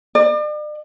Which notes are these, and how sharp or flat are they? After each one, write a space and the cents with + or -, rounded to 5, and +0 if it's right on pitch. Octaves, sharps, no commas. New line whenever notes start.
D5 +40